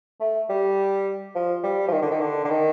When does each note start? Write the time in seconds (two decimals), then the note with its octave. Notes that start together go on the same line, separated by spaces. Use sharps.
0.20 A3
0.49 G3
1.35 F3
1.63 G3
1.88 F3
1.92 D#3
2.02 D3
2.11 D#3
2.21 D3
2.44 D3
2.49 D#3